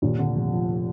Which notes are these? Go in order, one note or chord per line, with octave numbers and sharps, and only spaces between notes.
D#2 A#2
D3
F1
F3